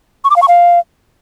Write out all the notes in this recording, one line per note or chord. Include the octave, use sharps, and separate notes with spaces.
C#6
D6
F5
C#6
F5